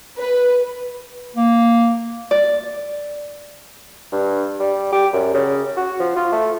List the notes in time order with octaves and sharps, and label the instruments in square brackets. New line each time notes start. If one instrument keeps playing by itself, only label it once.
[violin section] B4
[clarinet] A#3
[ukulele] D5
[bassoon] G2
G3
G4
F#2
C#3
F#4
F3
F4
A3